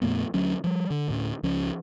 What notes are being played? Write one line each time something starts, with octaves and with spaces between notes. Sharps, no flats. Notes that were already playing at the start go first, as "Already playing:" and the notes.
F2 A#2 A3 B3
D2 F#3 C#4 D4
F3 G3
D3 D4
D2 A2 C#4
C#2 F3 C#4